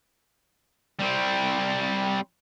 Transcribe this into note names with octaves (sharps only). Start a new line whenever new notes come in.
G3 C4